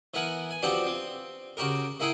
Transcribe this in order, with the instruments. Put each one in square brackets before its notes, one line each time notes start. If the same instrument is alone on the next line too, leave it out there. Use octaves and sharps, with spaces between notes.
[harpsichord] E3 B3 A#4 F#5 G#5
G#5
F3 B3 C4 D4 F#4 G4
C4
C#3 F#4 G4 A#4
A#3 E4 G#4 F#5 G5